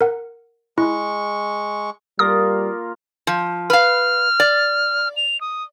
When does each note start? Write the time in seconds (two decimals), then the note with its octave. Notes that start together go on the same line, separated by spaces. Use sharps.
0.01 A#4 F#5
0.78 G#3 E4 C#6
2.19 G3 A#3 F4 A#4 D#6
3.27 F3
3.70 B4 F5 F6
4.40 D5
5.17 F7
5.41 D#6